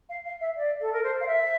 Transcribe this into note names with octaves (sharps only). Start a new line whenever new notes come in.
F5
F5
E5
D5
A4
A#4
C5
F5
E5